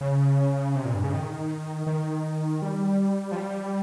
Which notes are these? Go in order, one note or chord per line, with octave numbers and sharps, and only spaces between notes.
C#3
C3
A#2
G2
C#3
D#3
D#3
G3
F3
G3